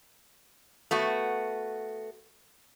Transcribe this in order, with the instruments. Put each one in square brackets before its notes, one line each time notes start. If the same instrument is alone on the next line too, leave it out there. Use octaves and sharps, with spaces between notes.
[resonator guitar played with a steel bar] A3 B3 F#4